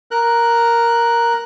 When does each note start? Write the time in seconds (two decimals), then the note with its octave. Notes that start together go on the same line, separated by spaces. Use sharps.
0.11 A#4 F#6